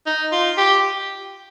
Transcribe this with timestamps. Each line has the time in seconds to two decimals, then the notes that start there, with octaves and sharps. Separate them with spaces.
0.06 D#4
0.32 F4
0.57 G4